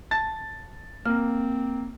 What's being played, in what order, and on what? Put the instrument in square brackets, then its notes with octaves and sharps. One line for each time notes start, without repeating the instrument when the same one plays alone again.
[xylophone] A5 [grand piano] A6
[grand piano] A#3 [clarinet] C4 [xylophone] F6